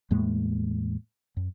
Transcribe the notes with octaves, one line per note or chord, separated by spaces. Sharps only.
E2 A2 G#3 A#3
F#2